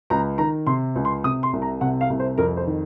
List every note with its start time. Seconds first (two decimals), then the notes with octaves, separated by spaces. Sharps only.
0.10 C#2 A#5
0.38 D#3 A#5
0.67 C3 C6
0.96 C#2
1.05 C6
1.24 C3 D#6
1.43 C6
1.53 C2
1.62 A#5
1.81 C3 F#5
2.01 F5
2.10 C2
2.20 C5
2.38 F2 A#4
2.57 C5
2.67 D#3